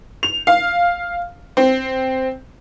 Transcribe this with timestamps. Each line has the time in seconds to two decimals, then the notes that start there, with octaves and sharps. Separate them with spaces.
0.23 F7
0.47 F5
1.57 C4